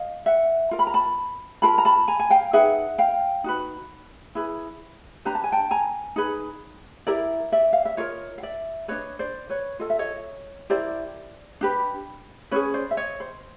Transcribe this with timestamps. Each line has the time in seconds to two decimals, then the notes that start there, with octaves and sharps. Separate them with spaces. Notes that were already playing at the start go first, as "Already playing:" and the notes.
Already playing: D#5 F5
0.26 E5 F#5
0.71 F4 A#4
0.79 B5
0.87 A#5
0.94 A5 B5
1.62 F4 A#4 A5 B5
1.78 A#5
1.85 A5 B5
2.08 G#5 A#5
2.19 G#5
2.30 F5 G5
2.53 D#4 G#4 B4 E5 F#5
2.98 F5 G5
3.44 D#4 F#4 B4
4.35 E4 G#4 B4
5.25 D4 G4 B4 A#5
5.35 A5
5.44 G#5
5.52 G5 A5
5.71 G#5 A#5
6.16 D#4 G#4 B4
7.07 E4 G4 A#4 D5 E5
7.52 D5 E5
7.73 F5
7.85 E5
7.97 F4 A#4 C#5 D#5
8.38 F5
8.43 D5 E5
8.88 D4 F#4 B4 C#5 D#5
9.19 C5 D5
9.50 B4 C#5
9.79 F4 A4 D#5
9.90 E5
9.99 C#5 D#5
10.70 E4 G4 A#4 C5 D5
11.61 D4 G4 B4
12.51 C#4 E4 G#4 B4 C#5
12.74 C5 D5
12.91 E5
12.97 C#5 D#5
13.20 C5